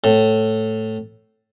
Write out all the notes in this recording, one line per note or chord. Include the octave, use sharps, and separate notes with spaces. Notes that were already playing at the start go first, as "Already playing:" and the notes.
A2